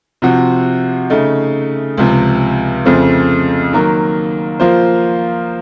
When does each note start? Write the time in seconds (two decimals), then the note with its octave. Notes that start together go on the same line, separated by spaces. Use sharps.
0.22 C3 F3 C4 F#4
1.10 C#3 A3 D#4
1.98 C#2 C3 F3
2.85 F2 C#3 F3 A3 C4
3.73 D#3 F#3 A#3
4.60 F3 A#3 F4 C5